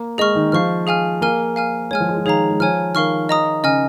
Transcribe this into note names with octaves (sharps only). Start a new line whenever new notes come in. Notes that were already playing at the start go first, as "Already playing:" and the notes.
Already playing: A#3
G#3 G#4 D#5 C#6 F6
D#3
F3 F5 C#6 F6
G#4 F5 G#5 F6
A#3 A#4 F5 G#5 F6
F5 G#5 F6
G#3 C#5 G#5 F6
F3
G#3
F3
D#3 G#4 C#5 F5 A#5
G#3
F3 C#5 G#5 F6
D#3 A#4 F5 C#6 F6
D#5 A#5 D#6
C#3 D#5 G#5 F6